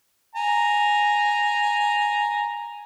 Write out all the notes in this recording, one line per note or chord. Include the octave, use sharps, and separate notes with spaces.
G#5 A#5